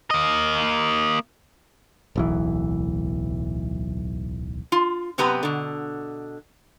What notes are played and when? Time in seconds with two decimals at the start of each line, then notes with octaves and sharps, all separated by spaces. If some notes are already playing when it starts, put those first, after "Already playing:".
0.11 A#3 D#5
2.16 D1 B1 E3
4.72 F4
5.18 F#2 C3 B3 G4 B4 A#5
5.43 B2 D3